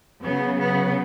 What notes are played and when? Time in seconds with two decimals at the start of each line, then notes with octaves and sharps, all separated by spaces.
0.23 C#3 F#3 B3
0.58 B3